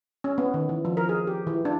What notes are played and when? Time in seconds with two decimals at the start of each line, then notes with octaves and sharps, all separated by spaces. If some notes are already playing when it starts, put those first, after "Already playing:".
0.24 C#4
0.38 B3
0.54 D#3
0.69 E3
0.85 F3
0.97 A#4
1.09 G#4
1.27 G4
1.47 E3
1.65 D4